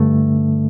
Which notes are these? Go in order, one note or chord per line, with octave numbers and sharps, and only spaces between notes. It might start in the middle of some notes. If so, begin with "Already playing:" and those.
Already playing: G2 D3 A3